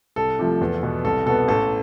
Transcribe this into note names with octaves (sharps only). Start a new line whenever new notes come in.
C2 A4
C3 F3 A3
E2
B2 B3
C2 A4
B2 B3 A4
A1 A4